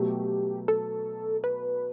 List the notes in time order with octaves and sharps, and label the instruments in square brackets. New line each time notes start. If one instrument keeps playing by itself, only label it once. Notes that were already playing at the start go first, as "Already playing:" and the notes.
Already playing: [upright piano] B2 F#3 A3 [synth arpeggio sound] G4
[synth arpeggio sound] A4
B4